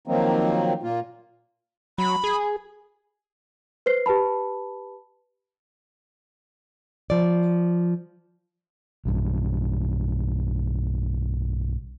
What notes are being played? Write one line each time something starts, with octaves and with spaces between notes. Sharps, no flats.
D#3 F3 F#3 A#3 C4 D#4
A#2 A#3 F4
F#3 B5
G#4
B4 C5 C7
G4 B4 A5 B5
F3 D5
B1 G2